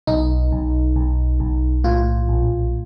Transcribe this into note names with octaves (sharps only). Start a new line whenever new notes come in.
B1 D#4
B1
B1
B1
A2 F4
A#1